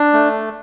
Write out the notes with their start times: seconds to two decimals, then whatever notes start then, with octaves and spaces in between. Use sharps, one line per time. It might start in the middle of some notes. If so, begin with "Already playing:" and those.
Already playing: D4
0.13 A3